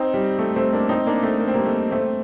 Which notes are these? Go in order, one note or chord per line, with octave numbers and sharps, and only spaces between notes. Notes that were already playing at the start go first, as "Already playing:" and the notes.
Already playing: C4 D#4
G3
A3
A3 C4
A#3 D4
C4 D#4
A#3 D4
A3 C4
A#3
C4
G3 A#3
A3
A3 C4